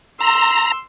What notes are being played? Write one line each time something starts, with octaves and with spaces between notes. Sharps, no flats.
A#5 C6 E6